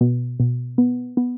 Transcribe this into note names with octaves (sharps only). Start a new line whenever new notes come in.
B2
B2
B3
B3